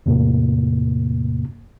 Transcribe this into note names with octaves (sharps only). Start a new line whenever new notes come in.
E2 A2 C3 A#3